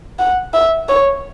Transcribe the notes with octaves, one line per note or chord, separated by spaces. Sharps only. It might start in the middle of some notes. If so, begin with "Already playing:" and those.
F#5
E5
C#5